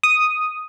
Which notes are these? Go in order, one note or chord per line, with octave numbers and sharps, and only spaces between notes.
D#6